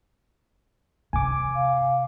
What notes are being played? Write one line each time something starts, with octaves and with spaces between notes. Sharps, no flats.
C3 G#5 D6
F5